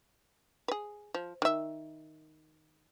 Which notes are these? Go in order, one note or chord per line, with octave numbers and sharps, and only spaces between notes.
G#4 B4
F3
D#3 E5